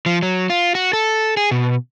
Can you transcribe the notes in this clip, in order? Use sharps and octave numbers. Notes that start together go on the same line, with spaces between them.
F3
F#3
F4
F#4
A4
G#4
B2